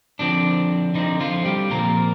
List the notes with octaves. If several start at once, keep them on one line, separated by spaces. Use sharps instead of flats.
D3 F3 C4 D4
D3 F3 C4 D#4
F3 F4
G3 G4
A#2 F3 A#3 C4 A#4